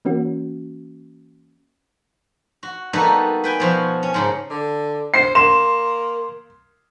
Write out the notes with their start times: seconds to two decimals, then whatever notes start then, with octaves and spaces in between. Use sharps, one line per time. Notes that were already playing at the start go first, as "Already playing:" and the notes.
0.05 E3 A#3 C#4 F#4
2.63 F#4
2.93 G3 A#3 B3 D#4 F#4 A4
3.44 B4 G5 G#5
3.60 B2 F3 F#4
4.03 C#4
4.14 G#2 C#3
4.50 D3
5.14 C5 C7
5.35 A#3 C6 E7